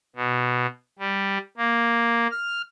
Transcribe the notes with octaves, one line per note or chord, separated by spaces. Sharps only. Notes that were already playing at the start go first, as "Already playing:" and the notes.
B2
G3
A#3
F6